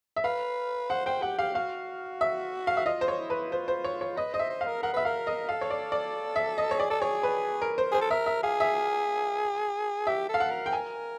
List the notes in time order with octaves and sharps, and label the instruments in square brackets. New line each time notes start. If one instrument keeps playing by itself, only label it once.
[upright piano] E5
[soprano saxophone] B4 [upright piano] F5
[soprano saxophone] C5 [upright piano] F#5
[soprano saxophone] C5 [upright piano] G5
[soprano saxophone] G4 [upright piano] F#5
[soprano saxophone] G4 [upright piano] F5
[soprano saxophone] F#4 [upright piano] F5
[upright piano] E5
F5
E5
[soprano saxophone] F4 [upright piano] D#5
[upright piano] C5
C#5
[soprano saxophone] E4
[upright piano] B4
[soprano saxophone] F4 [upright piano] C5
[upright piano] C5
C#5
C#5
[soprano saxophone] B4 [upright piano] D#5
[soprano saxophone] C5 [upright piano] D#5
[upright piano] E5
[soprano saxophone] C5
[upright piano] F5
[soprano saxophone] A#4
[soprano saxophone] A#4 [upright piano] F#5
[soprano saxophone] B4 [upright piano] E5
[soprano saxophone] A#4 [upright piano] F5
[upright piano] D#5
[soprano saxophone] A4 [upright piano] F5
[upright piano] C#5
D5
D5
E5
D#5
C#5
[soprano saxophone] G#4 [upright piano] D5
[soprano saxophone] A4 [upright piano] D5
[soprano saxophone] G#4 [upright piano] C#5
[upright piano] B4
A#4
C5
[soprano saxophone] G#4 [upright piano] C5
[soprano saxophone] A4
[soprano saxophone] A#4 [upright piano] E5
[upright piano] E5
[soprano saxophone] G#4 [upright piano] F5
[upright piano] E5
[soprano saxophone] G4 [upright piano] E5
[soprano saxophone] A4 [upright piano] F5
[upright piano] F#5
[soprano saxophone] A#4
[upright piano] G5
G#5